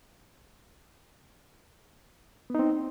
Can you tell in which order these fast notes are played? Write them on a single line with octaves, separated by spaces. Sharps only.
B3 D#4 C4